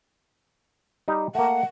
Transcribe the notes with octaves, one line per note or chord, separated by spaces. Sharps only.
G3 D#4 G4
A3 A#3 F#5